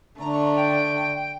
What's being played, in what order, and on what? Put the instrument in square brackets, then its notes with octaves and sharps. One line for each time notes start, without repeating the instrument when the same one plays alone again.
[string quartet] D3 A3 D4 [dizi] A#5
[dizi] C#6
A#5
G5